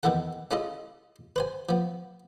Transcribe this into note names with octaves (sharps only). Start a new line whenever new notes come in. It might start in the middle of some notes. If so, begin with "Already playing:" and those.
E2 D#3 E3 E4 A4 F#5
C#4 E4 F4 G#4 A4 D#5
B4 C5 G#5
F3 B3